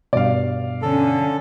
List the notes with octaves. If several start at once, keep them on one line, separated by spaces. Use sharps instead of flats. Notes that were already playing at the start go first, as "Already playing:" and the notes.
G2 B2 D5 F5
D3 C#4 A4